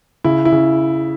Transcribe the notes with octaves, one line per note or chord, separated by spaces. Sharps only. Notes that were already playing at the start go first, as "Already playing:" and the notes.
C#3 E4
E4
C#3